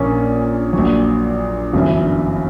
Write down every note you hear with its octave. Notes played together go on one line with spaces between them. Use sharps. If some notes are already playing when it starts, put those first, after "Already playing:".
Already playing: A#1 A#2 A#3 C#4
A#1 A#2 F#3
G1 F#2 E3